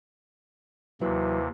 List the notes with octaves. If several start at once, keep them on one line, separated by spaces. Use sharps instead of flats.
D#2 C3 E3 F#3